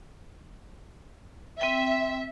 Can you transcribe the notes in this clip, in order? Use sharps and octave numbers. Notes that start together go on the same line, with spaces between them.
C4 E5 G5